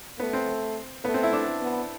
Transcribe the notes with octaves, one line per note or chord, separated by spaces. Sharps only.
A3 B3
C4
A3 B3
C4
E4
D4
B3